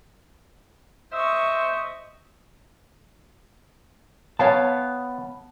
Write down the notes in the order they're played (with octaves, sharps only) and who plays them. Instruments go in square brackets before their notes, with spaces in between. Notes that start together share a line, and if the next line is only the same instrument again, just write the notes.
[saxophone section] C5 E5 [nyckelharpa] D#5 C#6
[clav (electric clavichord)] B3 [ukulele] C#5 F5 G5 [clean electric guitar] A5